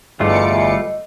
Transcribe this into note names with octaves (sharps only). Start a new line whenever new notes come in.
G1 E2 G3 A3 F4 D#5 D6 C#7